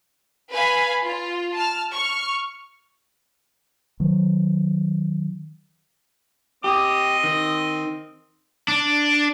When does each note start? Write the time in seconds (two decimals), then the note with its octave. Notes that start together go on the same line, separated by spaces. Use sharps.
0.53 B4 F5 G#5 B5
1.04 F4
1.55 A5 F6
1.93 C#6 F6
4.00 D#3 F#3
6.64 C4 G4 D#5 D#6
7.24 D#3
8.68 D4